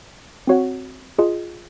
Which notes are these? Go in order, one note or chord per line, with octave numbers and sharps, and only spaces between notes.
C4 F#4 C#5 F#5
F4 G#4 D#5